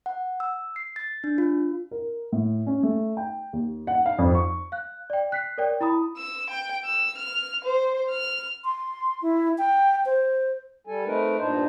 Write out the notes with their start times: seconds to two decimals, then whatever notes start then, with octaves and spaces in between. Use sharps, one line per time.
0.06 F#5
0.40 E6
0.76 C7
0.96 A6
1.24 D4
1.38 F4
1.91 A#4
2.32 A2
2.67 C#4
2.83 A3
3.17 G5
3.53 D#2
3.87 F#5
4.06 F5
4.19 F2
4.35 C#6
4.72 F5 F#6
5.10 D5 G5
5.32 F#6 B6 C7
5.58 A#4 C#5 D5 G5
5.81 E4 A#5 B5 D#6
6.17 E6
6.49 G5
6.85 E6
7.18 F6
7.64 C5
8.10 F6
8.64 C6
9.22 E4
9.58 G5
10.06 C5
10.87 G3 A4 G#5
11.06 A3 C4 D#4 A#4 B4
11.39 G2 A#2 D4 D#4 C5